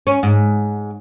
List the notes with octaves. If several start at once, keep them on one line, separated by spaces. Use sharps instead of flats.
C#4
G#2